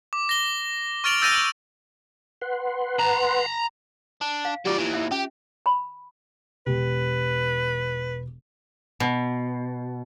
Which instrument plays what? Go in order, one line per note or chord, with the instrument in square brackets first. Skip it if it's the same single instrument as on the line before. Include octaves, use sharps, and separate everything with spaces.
[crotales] D6
A#6 G7
C#6 F6 A6 D7 F7 F#7
E6 G6 A6 A#6 D#7 F7
[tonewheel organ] B4 F#5 C6
[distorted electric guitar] A5 A#5
[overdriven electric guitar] D4
[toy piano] F5
[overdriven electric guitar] F#3 D5 [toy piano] F4 G4
[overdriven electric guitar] D#2 E3
[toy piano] E5
[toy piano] C#4 [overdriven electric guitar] G4
[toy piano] B5
[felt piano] E1 G4 [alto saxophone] B4
[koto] B2